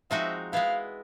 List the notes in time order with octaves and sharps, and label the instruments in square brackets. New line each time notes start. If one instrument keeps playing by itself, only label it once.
[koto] F3 G#3 C4 D#4 F#4 [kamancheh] E5
[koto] G#3 B3 E4 [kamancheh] F5